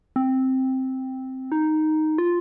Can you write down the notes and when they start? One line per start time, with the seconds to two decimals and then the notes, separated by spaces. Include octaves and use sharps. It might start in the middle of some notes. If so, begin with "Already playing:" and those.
0.16 C4
1.52 D#4
2.18 F4